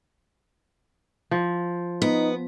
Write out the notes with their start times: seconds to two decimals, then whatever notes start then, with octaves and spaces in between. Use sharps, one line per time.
1.31 F3
2.02 B3 D#4